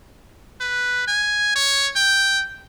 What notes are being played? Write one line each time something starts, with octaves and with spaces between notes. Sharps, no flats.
B4
G#5
C#5
G5